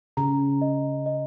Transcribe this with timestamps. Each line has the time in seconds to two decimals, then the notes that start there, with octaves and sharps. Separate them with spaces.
0.17 C#3 A#5
0.61 D#5
1.06 D#5